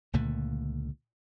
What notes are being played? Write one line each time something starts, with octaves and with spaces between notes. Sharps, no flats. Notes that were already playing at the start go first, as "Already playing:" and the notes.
C#2 A#2 D3 A3